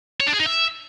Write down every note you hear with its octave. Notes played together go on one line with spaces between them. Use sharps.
C#5
D4
G#4
D#4
E5